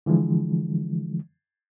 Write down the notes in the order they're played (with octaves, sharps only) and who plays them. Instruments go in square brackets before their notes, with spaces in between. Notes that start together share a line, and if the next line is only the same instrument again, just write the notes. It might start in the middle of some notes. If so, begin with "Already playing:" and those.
[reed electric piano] D3 E3 F3 G#3